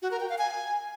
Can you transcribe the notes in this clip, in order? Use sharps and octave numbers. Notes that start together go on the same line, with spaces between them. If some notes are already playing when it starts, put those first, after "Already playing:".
F#4
A#4
G5
F5
G#5